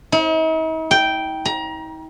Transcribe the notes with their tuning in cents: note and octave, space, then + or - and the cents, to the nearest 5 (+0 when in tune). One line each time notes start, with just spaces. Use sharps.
D#4 +45
G5 -5
A#5 +30